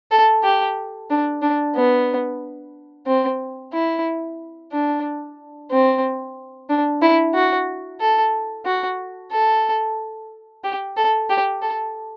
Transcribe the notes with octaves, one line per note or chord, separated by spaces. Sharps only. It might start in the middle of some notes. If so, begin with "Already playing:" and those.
A4
G4
D4
D4
B3
C4
E4
D4
C4
D4
E4
F#4
A4
F#4
A4
G4
A4
G4
A4